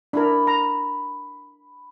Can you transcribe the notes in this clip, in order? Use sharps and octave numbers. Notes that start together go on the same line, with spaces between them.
D4 E4 A#4 B5
A#5